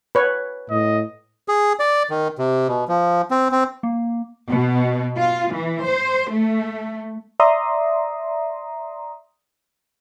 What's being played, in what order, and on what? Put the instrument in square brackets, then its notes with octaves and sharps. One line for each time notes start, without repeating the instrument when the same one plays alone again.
[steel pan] B4 C#5
[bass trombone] A2 [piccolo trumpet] D#5
[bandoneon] G#4
D5
D#3
C3
B2
F3
C4
C4
[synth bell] A#3
[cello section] B2
F4
E3
C5
A3
[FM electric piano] D5 E5 A#5 C6 D#6